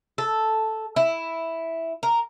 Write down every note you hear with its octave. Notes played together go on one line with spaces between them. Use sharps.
A4
E4
A#4